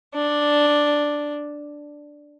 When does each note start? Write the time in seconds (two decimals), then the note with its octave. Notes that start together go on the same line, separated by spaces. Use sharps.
0.15 D4